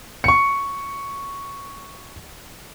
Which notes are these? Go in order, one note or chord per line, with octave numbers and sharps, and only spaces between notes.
C#6 C#7